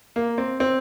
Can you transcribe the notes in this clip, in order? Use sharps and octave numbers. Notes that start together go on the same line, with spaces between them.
A#3
C4
C4